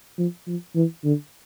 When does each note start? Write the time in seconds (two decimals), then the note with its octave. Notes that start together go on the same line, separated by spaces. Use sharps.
0.18 F3
0.47 F3
0.76 E3
1.04 D3